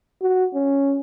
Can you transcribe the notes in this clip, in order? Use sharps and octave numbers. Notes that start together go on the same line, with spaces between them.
F#4
C#4